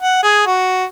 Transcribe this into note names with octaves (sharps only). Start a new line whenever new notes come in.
F#5
G#4
F#4